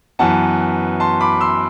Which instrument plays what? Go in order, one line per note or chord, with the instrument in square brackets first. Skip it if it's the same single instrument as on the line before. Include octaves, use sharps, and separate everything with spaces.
[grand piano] F#2 E3 B3 F#5 A5
A5 C6
B5 D6
C6 E6